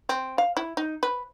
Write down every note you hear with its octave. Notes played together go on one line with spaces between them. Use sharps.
C4
F5
E4
D#4
B4